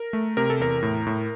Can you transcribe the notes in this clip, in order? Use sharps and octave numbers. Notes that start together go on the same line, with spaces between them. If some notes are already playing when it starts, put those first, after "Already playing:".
Already playing: A#4
A3
C3 A#4
A4
E2 A#4
A2
A2